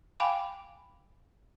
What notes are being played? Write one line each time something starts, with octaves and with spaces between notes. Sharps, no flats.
F5 G5 G#5 B5 D6